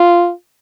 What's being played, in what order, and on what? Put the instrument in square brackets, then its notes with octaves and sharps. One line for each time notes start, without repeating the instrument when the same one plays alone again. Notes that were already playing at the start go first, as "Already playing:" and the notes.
Already playing: [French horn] F4